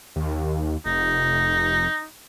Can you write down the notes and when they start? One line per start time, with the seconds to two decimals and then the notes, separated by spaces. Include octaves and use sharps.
0.16 D#2
0.85 F1 D#4